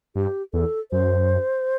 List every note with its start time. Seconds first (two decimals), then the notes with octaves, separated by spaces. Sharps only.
0.15 G2 G4
0.53 E2 A4
0.91 F#2 C5